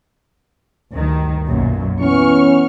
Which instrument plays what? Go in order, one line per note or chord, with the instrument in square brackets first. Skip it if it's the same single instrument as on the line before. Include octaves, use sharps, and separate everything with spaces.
[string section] D2 G2 D#3
B1 F#2 A#2
[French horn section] E3 B3 C#4 [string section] C#6 F6